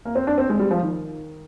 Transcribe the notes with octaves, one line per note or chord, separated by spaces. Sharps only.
A#3
C4
D4
C4
G#3
G3
F3
D#3